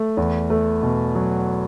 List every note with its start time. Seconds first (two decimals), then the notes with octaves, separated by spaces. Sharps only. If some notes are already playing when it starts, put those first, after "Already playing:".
Already playing: A3
0.17 E2
0.50 A3
0.83 B2
1.15 F#3